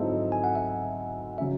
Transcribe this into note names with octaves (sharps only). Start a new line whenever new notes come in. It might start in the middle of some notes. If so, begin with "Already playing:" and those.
Already playing: G#2 F#3 C4 E4 A4 D#5
G#5
F#5
E5
C#3 F#3 E5